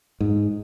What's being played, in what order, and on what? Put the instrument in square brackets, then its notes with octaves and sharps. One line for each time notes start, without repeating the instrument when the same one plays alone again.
[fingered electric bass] G#2